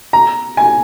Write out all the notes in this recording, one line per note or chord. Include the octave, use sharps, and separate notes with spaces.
A#5
G#5